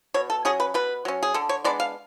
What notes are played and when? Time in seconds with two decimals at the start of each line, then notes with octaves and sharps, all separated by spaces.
0.14 B2 C#5
0.30 A4
0.45 F#3 C#4 G#4
0.60 B4
0.74 B2 B4
1.05 F#3 C#4
1.23 G#4
1.34 D3 A4
1.49 C#5
1.64 G#3 B3 D4 D5
1.80 F5